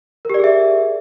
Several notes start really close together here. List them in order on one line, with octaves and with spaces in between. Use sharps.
A#4 G4 D5 G#4 E5